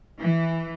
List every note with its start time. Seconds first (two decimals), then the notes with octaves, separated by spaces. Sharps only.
0.19 E3